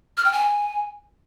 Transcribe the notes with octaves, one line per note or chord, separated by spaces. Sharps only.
F6
G5
G#5